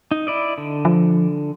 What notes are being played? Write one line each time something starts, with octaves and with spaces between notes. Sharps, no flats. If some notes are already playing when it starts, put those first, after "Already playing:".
D#4
E4 D5 D#5
D3
F3